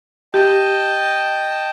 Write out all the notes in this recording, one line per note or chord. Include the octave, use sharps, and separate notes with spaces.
G4 D#5 G5 A5